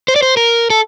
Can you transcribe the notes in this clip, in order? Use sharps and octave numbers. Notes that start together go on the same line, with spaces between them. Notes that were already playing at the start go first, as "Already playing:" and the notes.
C5
D5
C5
A#4
A4